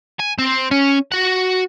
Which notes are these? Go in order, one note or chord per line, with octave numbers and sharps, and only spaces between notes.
G#5
C4
C#4
F#4 F#5